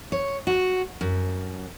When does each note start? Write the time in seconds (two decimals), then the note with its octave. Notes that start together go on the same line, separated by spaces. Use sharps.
0.12 C#5
0.47 F#4
1.01 F#2